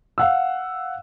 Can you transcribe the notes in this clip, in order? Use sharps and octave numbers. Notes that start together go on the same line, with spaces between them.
F5 F#5 E6